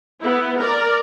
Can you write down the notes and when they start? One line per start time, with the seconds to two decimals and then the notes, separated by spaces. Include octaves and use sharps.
0.21 B3 E4
0.58 A#4 D5